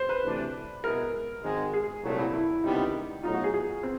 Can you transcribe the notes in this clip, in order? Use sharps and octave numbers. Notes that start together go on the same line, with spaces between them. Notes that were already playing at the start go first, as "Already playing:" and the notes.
Already playing: C5
B4
D2 C3 E3 A3 D4
B2 G#3 B3 E4 G#4 A#4
G#1 G#2 D#3 G#3
G#4
C2 A#2 F#3 A3
E4
E4
C#2 C3 D#3 G3 B3 D#4
B1 A2 F#3 B3 D#4 F4
F#4
G#4
G#4
C4